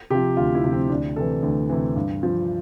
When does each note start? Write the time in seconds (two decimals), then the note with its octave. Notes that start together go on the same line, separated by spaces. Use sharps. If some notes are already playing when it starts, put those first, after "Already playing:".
0.10 C3 G4
0.15 F3
0.37 D2 F4
0.55 E4
0.64 C3 F3
0.72 C4
0.90 D2 D4
1.16 C3 E3 A4
1.43 D2
1.69 C3 E3
1.96 G2
2.23 F3